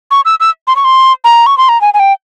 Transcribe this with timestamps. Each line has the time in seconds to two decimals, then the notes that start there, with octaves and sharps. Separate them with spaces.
0.11 C#6
0.25 E6
0.40 E6
0.67 C6
0.76 C#6
0.84 C6
1.24 A#5
1.46 C#6
1.58 C6
1.69 A#5
1.81 G#5
1.94 G#5
2.00 G5